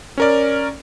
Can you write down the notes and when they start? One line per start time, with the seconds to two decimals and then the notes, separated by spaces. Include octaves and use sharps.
0.18 C#4 A#4 D5